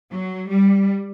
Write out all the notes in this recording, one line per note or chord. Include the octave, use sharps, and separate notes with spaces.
F#3
G3